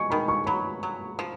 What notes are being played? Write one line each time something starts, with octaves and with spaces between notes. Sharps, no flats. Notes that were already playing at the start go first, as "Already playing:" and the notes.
Already playing: G#3 G#5 C#6
D#3 B5
C#6
F#3 B5
F#3
F3